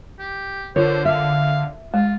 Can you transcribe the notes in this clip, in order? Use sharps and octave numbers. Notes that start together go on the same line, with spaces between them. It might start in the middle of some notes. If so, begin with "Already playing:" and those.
G4
D3 F4 A#4 C5 C#5
E5 F5
G#3 F4